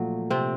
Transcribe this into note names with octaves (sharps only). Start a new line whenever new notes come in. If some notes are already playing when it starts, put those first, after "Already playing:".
Already playing: A#2 F3 F#3 A3
C3 C4